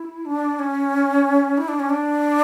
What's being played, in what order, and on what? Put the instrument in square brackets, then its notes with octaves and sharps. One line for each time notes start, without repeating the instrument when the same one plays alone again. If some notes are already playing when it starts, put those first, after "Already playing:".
Already playing: [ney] E4
D4
C#4
E4
D4
C#4
D4